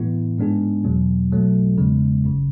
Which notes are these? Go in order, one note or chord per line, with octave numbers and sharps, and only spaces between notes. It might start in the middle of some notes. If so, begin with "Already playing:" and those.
Already playing: A2 E3 B3 E4
G#2 G#3 B3 D4 G#4
E2 B2 F#3
B1 B2 F#3 A3
E2 C#3 G#3 B3
G#1 F#2 C#3